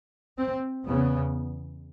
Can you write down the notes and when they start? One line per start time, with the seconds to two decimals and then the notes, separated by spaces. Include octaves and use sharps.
0.37 C4
0.84 E2 C#3 B3